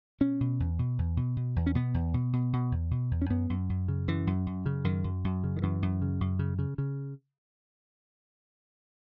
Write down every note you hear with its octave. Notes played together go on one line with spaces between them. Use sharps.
B2 C#4
B2
E2
B2
E2
B2
B2
E2
C#4
B2 B3
E2
B2
B2
B2
E2
B2
E2
C#4
F#2 B3
F#2
F#2
C#3
F#2 E3
F#2
F#2
C#3
F#2 D#3
F#2
F#2
C#3
D#3
F#2 E3
F#2
C#3
F#2
C#3
C#3
C#3